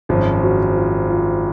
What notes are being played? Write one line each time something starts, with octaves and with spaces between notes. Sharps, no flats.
G#1 F#2 F3
F#4
F4
F4